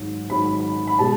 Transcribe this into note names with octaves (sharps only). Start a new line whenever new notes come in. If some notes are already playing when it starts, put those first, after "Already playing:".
Already playing: G#1 G#2 F#3
G#1 G#2 F#3 B5
B5
B2 G#3 A5